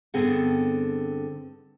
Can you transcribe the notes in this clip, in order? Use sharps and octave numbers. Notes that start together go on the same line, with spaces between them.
G2 D3 B3 C4 G#4 F#5